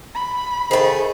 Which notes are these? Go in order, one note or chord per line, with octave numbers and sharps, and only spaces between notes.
B5
D#3 A3 G#4 C5